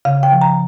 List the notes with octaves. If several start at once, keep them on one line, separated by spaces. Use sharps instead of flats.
C#3 F5
G5
F3
A#5